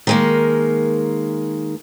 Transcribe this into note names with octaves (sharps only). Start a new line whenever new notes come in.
D#3 G#3 A#3